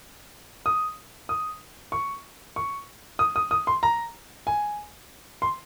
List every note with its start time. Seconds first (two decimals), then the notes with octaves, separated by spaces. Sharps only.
0.66 D#6
1.29 D#6
1.92 C#6
2.56 C#6
3.19 D#6
3.36 D#6
3.51 D#6
3.67 C6
3.83 A#5
4.47 G#5
5.42 C6